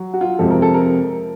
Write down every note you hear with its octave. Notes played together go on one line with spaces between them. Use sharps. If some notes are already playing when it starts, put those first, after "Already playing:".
Already playing: F#3
F#4
F4
F2 C3 F3 G#3 A4
A#4
A4
A#4